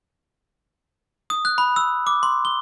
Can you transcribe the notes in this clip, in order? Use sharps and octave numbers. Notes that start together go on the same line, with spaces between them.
D#6
F#6
B5
E6
D6
C6
G7